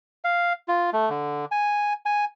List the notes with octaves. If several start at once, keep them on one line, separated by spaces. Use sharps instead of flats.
F5
F4
A3
D3
G#5
G#5